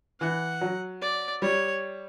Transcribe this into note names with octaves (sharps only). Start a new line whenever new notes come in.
E3 F#5
F#3
D5
G3 C#5